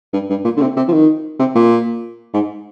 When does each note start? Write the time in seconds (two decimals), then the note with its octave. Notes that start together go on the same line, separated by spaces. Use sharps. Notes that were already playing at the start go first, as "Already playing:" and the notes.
0.13 G2
0.30 G2
0.44 A#2
0.57 D3
0.61 C3
0.76 C3
0.88 F3
0.92 D#3
1.39 C3
1.55 A#2
2.33 G#2